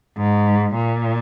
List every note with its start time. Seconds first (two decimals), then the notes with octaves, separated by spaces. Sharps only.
0.17 G#2
0.76 A#2